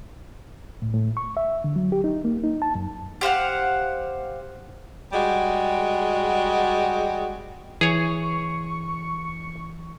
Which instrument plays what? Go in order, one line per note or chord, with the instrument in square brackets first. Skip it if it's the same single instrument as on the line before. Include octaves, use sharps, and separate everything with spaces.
[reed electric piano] A2
A2
C#6
E5
D3
F#3
G4
D#4
A#3
D#4
A5
F#2
[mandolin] G4 C5 F5 F#5
[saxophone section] G3 G#3 F#4
[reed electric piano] E3 [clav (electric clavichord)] G#4 C#5 [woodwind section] C#6